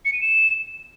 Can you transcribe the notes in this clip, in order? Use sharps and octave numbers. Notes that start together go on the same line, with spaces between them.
C#7
D#7
E7